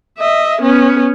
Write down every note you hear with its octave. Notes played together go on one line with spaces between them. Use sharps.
D#5 E5
B3 C#4